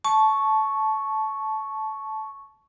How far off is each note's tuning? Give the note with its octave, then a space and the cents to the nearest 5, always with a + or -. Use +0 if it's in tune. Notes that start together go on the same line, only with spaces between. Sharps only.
A5 -15 C#6 +0